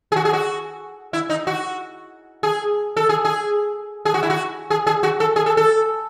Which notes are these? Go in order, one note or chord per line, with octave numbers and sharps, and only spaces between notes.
G#4
F#4
G#4
F#4
E4
D#4
F#4
G#4
A4
G#4
G#4
G#4
F#4
E4
F#4
G#4
G#4
F#4
A4
G#4
A4
A4